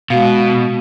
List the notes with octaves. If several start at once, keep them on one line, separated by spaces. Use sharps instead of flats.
B2 G#3 F#4 F5